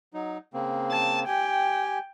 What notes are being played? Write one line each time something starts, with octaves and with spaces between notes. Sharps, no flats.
F#3 D#4
C#3 A#3 C4
A5
G4 G5 G#5